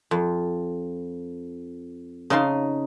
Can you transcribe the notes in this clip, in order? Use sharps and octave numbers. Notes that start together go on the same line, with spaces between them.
F2
C#3 D#4 D#5 A5 C6